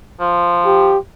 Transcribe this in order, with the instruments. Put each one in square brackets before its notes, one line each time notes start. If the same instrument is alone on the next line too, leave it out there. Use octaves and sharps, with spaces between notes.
[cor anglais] F3
[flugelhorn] G4